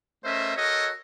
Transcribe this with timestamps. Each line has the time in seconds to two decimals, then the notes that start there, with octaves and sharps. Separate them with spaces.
0.25 A3 C#4 A#4 C5 D#5 E5
0.57 F#4 A4 A#4 C#5 D#5